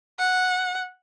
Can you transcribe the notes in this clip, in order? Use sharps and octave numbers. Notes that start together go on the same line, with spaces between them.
F#5